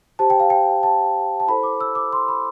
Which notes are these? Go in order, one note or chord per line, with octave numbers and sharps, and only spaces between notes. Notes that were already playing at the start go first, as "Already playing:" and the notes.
G4 C5 A5
G5
F5
G5
A5
A5
E4 A4 C5 B5
D6
E6
D6
C6
B5